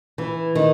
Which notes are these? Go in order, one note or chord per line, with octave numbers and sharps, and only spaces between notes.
E3
D#3